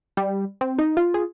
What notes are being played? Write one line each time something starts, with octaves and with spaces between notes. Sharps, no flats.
G3
C4
D#4
F4
G#4